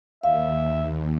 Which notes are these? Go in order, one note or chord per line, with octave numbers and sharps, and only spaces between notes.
D#2 E5 F5